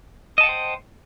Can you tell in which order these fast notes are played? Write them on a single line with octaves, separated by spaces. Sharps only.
D#5 A5 F#5 G5 C5